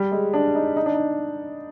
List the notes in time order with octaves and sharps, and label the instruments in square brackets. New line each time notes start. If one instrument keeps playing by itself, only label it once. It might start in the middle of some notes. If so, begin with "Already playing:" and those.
Already playing: [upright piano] G3
G#3
D4
D#4
D#4
D4
D#4